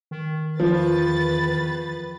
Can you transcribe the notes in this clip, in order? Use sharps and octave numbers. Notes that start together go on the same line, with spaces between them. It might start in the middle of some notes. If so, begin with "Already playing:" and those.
D#3
E2 F3 B4 A6